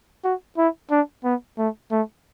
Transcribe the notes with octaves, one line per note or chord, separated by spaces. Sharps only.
F#4
E4
D4
B3
A3
A3